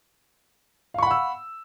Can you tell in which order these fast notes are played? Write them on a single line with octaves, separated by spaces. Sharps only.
F5 C#6 B5 F#5 E6